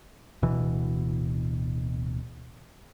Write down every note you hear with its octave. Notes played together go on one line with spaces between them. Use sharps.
D1 B2 E3